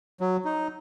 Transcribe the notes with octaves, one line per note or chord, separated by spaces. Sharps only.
F#3
D#4